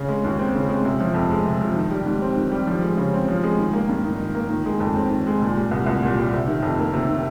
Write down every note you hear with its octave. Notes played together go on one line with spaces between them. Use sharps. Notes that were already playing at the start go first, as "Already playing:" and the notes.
Already playing: C#3
G#3
D#2
C4
C#3
G#3
C3
F3
F2
G#3
C3
F3
D#3
G3
G#2
C4
D#3
G3
F3
G#3
C#3
C4
F3
G#3
D#3
A#3
G2
D#4
D#3
A#3
D#3
G#3
F2
C4
D#3
G#3
A#2
G3
C2
C2
A#2
G3
C3
D#3
F2
A#3
C3
D#3